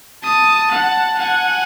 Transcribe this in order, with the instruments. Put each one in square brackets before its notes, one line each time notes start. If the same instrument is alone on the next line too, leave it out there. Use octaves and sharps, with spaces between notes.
[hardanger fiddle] A5 [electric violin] D#6
[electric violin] F#5
[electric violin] F#5 [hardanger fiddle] G#5